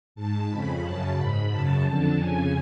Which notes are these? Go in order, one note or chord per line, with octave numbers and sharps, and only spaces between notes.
G#2 A5
F2 C#3 B5
F#2 C#3 A5
G#2 B5
F#2 C#3 A5
F2 D3
F2 C#3 G#5